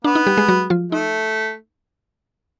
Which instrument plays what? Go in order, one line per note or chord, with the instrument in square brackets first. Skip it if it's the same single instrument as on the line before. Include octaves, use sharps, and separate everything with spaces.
[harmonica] B3 [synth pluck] D4
[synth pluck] D#4
G3 G4
G#3 G#4
F#3 F#4
F3 F4
[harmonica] A3 [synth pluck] D#4